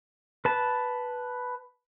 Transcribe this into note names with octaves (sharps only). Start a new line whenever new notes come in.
B4 A5